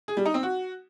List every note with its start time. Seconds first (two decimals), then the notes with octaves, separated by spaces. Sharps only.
0.08 G#4
0.17 G3
0.25 D#4
0.34 C4
0.43 F#4